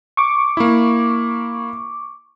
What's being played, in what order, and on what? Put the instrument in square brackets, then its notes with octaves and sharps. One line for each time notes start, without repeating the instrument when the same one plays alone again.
[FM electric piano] C#6 D6
[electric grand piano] A#3 E4